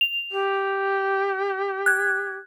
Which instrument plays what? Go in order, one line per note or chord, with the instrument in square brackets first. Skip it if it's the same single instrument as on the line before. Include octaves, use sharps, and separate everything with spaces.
[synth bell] F7
[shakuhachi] G4
[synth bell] F#6 G#6